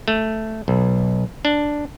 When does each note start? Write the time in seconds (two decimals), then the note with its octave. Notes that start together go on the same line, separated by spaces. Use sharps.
0.08 A3
0.68 B1
1.45 D4